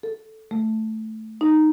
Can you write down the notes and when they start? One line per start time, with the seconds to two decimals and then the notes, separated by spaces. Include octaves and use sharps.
0.03 A4
0.51 A3
1.41 D#4